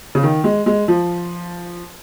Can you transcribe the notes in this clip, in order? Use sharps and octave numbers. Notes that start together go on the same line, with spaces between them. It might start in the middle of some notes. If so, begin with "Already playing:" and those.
C#3
D#3
G#3
G#3
F3